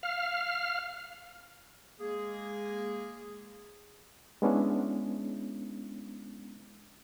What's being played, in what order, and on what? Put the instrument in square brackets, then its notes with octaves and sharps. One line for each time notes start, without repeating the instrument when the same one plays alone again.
[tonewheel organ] F5 F6
[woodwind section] G#3 A#3 G#4
[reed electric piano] G#3 B3 C#4 D4 E4